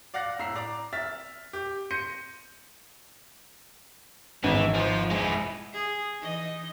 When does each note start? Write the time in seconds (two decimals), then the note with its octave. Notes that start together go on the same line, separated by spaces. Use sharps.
0.14 D5 F5 F#5 F#6 A#6
0.39 A2 A#5 E6 C7
0.55 D5 A#5 D6
0.93 E5 F6 A6 B6
1.53 G4
1.91 C6 G6 A#6 C#7 D#7
4.44 G#1 E3
4.74 F3 C5
5.10 G#3 E4
5.72 G#4
6.20 E3 D#4 D#5